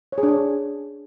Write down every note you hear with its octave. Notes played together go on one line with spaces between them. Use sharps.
C#5
G#4
D4
C#5